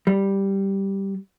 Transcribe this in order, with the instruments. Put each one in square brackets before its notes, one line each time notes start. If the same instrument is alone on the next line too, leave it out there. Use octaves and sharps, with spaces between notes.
[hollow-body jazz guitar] G3